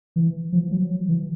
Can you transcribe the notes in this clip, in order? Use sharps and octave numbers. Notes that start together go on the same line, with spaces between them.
E3
F3
F#3
E3